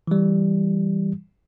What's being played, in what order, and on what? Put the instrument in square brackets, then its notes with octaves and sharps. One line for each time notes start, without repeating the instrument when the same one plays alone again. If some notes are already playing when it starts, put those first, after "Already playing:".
[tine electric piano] E3 G3